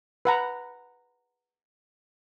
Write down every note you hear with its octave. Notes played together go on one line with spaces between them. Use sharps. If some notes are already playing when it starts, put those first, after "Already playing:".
B4 F#5 A#5